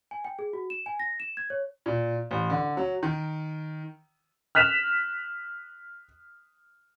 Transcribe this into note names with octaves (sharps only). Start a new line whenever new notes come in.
G#5
G5
G#4
F#4
E7
G#5
A#6
E7
G#6
C#5
A#2
A1
D3
F#3
D#3
F6 F#6 B6 E7 F7